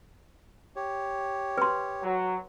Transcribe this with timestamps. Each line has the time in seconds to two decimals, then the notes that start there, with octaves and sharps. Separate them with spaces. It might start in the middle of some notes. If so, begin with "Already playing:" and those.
0.76 G4 C#5
1.58 B4 C6
2.03 F#3